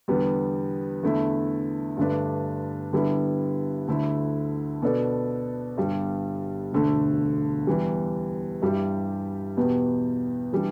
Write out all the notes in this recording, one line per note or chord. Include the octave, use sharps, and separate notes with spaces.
E2 D3 G3 B3
E2 D3 A3 E4
G2 D3 A3 D4 B4
D3 G3 B3 E4
D2 D3 A3 E4
B2 B3 D4 A4 D5
G1 G2 G3
E1 D2 D3 A3
E2 E3 G3
G2 G3 E4 G4
E2 B2 B3 G4
E3 G3 D4